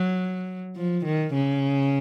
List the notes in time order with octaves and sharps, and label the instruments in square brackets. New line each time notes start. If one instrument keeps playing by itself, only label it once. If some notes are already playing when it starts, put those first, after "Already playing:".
Already playing: [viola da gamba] F#3
F3
D#3
C#3